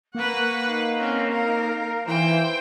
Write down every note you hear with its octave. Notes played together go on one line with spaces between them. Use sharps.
A#3 B4 F#5 C#6
D#4 F5
C4 C#4
A#4
E3 C5 G5